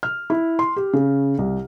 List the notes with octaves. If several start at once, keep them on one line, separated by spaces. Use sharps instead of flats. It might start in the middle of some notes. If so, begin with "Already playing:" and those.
F6
E4
C6
G4
C#3
C2